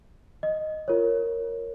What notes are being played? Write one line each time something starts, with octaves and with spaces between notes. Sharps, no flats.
D#5
F4 A#4 C#5